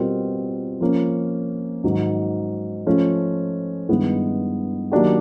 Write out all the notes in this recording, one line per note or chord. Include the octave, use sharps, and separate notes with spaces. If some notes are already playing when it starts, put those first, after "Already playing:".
Already playing: B2 G3 C4 F4 A#4
F3 A#3 C#4
G#2 D#3 F#3
F3 A3 C#4
G2 D#3 G#3 B3 E4
D#3 F#3 A#3 D4 G4